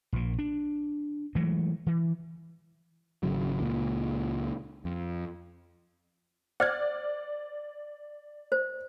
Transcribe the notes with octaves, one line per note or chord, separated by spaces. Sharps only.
A#1 A#2
D4
E3 F#3 G#3 A3
E3
G#1 C#3 F#3
C#2 A#2
F2
C5 D5 F#5 F6 G#6
C5